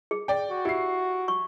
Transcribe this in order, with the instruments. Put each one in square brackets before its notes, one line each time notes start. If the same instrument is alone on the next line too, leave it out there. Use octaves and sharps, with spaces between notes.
[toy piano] G#4
[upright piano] D5 G5
[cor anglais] F#4
[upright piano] E4 C7 [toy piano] G4
[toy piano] C#6